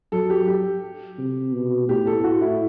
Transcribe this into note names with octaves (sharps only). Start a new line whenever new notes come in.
F#3 A4
G4
G4
C3
B2
A2 G4
A4
F#4
E4